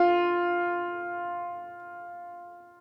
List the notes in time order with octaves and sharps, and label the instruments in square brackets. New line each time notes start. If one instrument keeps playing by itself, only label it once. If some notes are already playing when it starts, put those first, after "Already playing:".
Already playing: [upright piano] F4